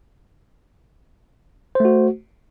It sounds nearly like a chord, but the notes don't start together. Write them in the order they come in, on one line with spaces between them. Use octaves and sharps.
C5 A3 F#4